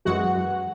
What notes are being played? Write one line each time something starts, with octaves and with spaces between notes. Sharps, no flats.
F#2 E3 G#3 F#4 F#5